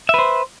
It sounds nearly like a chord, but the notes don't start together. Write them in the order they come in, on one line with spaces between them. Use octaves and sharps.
E5 B4 C5